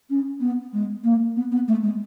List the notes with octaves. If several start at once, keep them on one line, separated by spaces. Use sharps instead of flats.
C#4
B3
G#3
A#3
B3
B3
A3
G#3